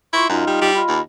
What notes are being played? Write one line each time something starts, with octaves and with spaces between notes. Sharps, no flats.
E4 F4 C6 C#6
F#2 D#4 F4 D#5
G3
G3
F4 D#5 B5
D#2